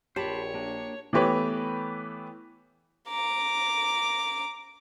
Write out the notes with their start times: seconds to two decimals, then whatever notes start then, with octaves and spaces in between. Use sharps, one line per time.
0.16 A#1 G4 C5 C#5 A5 B5
0.54 A#3 D4
1.13 E3 A3 B3 G4 B4 C#5
3.09 A#5 D6